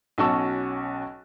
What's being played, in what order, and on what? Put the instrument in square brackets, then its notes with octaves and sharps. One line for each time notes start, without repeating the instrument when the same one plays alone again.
[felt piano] B1 C#4 F#4 A5 C#6 E6